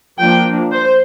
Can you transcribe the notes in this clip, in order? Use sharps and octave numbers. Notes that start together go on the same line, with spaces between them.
F3 A#3 D4 G5
C5